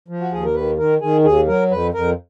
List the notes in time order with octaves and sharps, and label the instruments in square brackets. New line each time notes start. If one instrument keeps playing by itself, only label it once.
[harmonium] F3
F#4
D#2 G#4
A#4
D#3 B4
D#3 A#4
D#3 G#4
D#2 G#4
F#3 A#4
F2 B4
F2 A#4